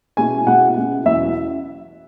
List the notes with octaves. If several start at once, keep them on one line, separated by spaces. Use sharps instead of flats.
B2 G#3 C#4 E4 G#5
B2 G#3 C#4 E4 F#5
B2 G#3 C#4 E4
E2 B2 F#3 C#4 E4 E5